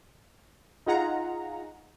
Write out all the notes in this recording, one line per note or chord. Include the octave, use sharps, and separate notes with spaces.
D#4 F4 G#4 F#5 A#5